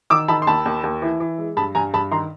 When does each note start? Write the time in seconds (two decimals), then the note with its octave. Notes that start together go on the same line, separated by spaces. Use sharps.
0.10 D#3 D6 E6
0.28 D#3 A5 B5
0.42 C6
0.47 D#2 A5 B5
0.65 D#2
0.83 D#2
1.02 E3
1.20 E3
1.39 G#3
1.57 G2 A5 B5
1.75 G2 G#5 A#5
1.94 G2 A5 B5
2.12 D#3 A#5 C6